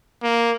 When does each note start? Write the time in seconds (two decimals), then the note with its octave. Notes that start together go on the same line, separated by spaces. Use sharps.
0.23 A#3